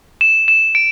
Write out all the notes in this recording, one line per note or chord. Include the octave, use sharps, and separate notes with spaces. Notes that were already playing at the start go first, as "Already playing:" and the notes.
E7
E7
D7